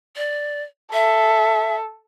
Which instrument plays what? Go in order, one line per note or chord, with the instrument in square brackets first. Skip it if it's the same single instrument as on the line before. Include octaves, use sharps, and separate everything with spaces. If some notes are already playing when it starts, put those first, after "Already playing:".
[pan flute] D5
[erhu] A4 [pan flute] E5